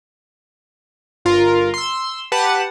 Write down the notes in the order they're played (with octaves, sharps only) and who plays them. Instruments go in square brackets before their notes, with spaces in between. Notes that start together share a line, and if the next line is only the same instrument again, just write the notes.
[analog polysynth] G1 F4 A#4
C6 E6
G4 B4 F#5 A5